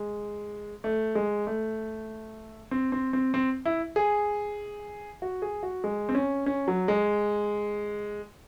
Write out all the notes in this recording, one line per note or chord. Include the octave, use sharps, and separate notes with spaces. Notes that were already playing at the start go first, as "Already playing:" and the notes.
Already playing: G#3
A3
G#3
A3
C4
C4
C4
C4
E4
G#4
F#4
G#4
F#4
G#3
C4
C#4
C#4
F#3
G#3